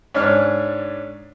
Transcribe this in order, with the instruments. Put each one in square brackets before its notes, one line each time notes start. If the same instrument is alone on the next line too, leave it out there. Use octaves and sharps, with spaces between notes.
[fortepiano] G#2 C#4 D4 C#5 F6